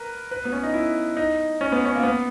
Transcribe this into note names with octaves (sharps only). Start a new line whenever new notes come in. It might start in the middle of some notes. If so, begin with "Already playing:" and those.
Already playing: A#4 B4
B4
B3
C#4
D#4
E4
D#4
C#4
B3
C#4
A#3
B3